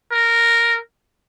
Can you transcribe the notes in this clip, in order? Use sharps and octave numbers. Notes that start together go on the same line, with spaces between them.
A#4